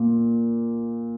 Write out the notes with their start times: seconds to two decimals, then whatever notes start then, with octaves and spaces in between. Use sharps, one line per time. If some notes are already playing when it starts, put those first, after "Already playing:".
Already playing: A#2